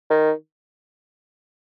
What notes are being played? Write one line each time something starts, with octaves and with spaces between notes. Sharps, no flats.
D#3